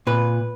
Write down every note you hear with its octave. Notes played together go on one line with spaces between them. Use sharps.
A#2 B4